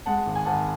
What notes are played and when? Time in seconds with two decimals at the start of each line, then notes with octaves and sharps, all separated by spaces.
0.06 G#3 F#5 A5
0.26 G#1
0.35 G#5
0.45 G#1 F#5 A5